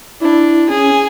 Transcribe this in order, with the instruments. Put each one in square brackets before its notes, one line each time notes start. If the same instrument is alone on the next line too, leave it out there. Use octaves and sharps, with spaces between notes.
[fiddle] D4 [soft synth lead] E4
[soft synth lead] C#4 [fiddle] G#4